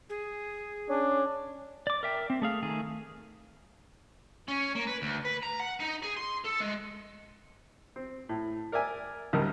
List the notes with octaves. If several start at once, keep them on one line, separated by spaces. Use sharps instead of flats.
G#4
C#4 D4
D5 D6
A#4 E5 G5
C4
A3 G#4 F5
D#3 A3 G#4
C#4
A#3
B4
D2
B4
A#5
F#5
D#4
G#4
C6
A4
G#3
C4
A2
A#4 D5 E5 G#5
A1 D2 G3 D#4 A#4